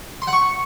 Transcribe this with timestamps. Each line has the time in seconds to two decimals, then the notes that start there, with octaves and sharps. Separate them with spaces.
0.22 C6
0.27 F#5
0.33 C#6